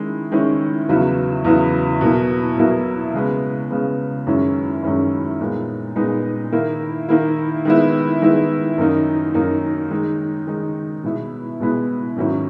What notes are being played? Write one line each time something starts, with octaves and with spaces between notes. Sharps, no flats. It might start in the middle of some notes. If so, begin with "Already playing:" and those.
Already playing: D#3 G#3 C#4 E4
D#3 G#3 C#4 E4
E2 C#3 F#3 B3 E4
E2 C#3 F#3 B3 E4
B2 F#3 A#3 E4
B2 F#3 A#3 E4
C#3 G#3 B3
C#3 G#3 B3
F#2 D#3 G#3 C#4 E4
F#2 D#3 G#3 C#4 E4
A#2 G#3 B3 D#4
A#2 G#3 B3 D#4
D#3 A#3 E4
D#3 A#3 E4
D#3 G#3 B3 E4
D#3 G#3 B3 E4
F#2 D#3 A#3 D#4
F#2 D#3 A#3 D#4
D#3 G#3 D#4
D#3 G#3 D#4
B2 G#3 B3 E4
B2 G#3 B3 E4
G#2 D#3 F#3 C#4 E4